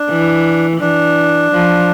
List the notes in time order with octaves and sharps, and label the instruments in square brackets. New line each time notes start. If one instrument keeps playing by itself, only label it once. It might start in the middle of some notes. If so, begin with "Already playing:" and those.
Already playing: [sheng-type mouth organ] D4
[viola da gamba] E3
[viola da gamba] E3 [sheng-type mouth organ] D4
[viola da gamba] F3